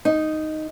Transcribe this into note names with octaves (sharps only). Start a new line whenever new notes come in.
D#4